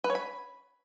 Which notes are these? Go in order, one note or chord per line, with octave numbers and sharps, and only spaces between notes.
B4
C#5
B5